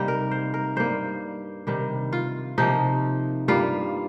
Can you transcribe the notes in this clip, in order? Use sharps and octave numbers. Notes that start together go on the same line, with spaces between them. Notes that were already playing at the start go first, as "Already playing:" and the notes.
Already playing: C3 G3 A#3 D#4
A#4
C5
A#4
G2 G3 A#3 C5
C3 D#3 G3
F4
C3 F3 A#3 D#4
G2 G3 A#3 F4